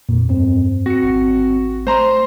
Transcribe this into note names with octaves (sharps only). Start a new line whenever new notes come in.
F2 A#2
G2 C4
C4 F#4 A#6 C#7
G#1
A3 C5 A#5 C6